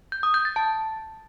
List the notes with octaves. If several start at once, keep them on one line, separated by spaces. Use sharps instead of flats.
G6
D#6
G6
A6
A5